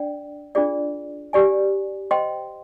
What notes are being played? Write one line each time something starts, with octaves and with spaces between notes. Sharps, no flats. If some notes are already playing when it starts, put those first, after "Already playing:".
Already playing: D4 D5 G5
D4 F4 G#4 D5
G4 D5 G#5
C5 D#5 G5 C6